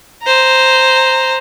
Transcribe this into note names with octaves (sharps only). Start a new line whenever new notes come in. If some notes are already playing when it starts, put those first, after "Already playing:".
C5 A#5